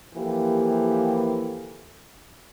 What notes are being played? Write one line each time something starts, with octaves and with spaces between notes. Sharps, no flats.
E3 F3 A#3 G4 A4